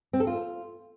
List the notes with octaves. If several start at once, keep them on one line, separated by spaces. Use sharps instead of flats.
C4
A4
F4